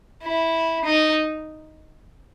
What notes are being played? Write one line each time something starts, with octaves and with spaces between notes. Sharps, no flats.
E4
D#4